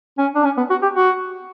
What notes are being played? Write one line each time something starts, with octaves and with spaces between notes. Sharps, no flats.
C#4
D4
C#4
B3
F#4
G4
F#4